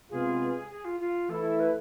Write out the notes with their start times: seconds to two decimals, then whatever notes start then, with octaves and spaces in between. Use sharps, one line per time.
0.10 C3 G#3 B3 F4 G#4
0.70 G#4
0.85 F4
1.00 F4
1.29 E3 A3 E4 A4
1.60 B4